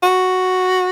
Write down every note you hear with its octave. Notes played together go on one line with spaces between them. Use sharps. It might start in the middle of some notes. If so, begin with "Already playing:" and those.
F#4